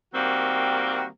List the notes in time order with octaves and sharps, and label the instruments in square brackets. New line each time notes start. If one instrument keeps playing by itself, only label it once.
[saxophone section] D#3 G3 A#3 C4 F#4